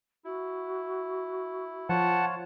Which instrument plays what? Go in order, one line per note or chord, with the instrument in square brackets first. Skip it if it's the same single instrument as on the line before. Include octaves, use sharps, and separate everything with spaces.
[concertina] E4 [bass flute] F#4
[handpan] F3 [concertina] F4 C#5 [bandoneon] F#5 A5